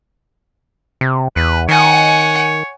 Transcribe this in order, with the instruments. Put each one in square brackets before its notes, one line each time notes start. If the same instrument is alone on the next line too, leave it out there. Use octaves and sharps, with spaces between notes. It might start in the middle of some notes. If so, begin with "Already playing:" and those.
[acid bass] C3
[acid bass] E2 [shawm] B4
[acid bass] D#3 [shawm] C#5 [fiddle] F#5 G#5